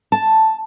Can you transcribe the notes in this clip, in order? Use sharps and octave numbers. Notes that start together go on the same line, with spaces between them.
A5